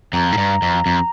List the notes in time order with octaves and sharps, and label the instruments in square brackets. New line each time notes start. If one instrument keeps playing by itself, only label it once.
[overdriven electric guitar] F2 [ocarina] A#5
[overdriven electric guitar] G#2
G2
F2
F2